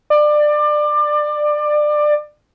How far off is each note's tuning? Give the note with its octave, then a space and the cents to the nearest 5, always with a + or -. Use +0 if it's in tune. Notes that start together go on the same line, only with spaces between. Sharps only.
D5 +25